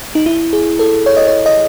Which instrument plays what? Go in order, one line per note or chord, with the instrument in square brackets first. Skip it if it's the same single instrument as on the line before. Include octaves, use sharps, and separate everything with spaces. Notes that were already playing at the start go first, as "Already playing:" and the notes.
[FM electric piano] D#4
E4
G#4
A4
C#5
D#5
C#5
D#5